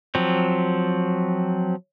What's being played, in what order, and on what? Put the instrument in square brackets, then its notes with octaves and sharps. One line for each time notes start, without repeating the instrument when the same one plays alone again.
[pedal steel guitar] F3 F#3 C4